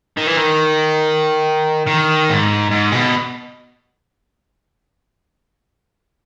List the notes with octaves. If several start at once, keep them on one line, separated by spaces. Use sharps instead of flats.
D#3
E3
D#3
D#3
G#2
G#2
B2